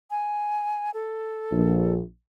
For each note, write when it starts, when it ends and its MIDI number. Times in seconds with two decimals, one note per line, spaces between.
0.11 0.91 80
0.94 1.94 69
1.52 2.01 34